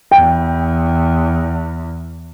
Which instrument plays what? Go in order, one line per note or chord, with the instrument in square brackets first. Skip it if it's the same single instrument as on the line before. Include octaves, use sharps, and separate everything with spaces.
[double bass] E2 [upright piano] G5